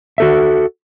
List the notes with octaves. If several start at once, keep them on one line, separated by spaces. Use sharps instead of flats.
F#4 A4 E5